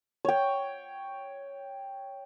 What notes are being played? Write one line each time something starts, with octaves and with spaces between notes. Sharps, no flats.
C#5 G5